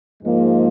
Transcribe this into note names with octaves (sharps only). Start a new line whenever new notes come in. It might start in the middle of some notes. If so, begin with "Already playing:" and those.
G#2 F3 G#3 A#3